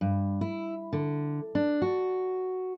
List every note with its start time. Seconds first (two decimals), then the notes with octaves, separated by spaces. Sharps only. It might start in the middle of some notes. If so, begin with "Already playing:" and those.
0.01 G2
0.41 E4
0.93 D3
1.55 D4
1.82 F#4